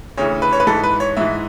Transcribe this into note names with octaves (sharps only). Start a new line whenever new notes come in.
D2 C#3 E3 C#5
B4
C#5
B4
G#2 E3 A4
B4
C#5
G#2 E3 E5